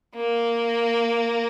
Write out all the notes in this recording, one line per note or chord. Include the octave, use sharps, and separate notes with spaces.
A#3